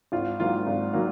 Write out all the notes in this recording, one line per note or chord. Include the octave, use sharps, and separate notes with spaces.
G#1 F4
G#2 D#3 F#3 A#3 F4
G#1
D#3 F#3 A#3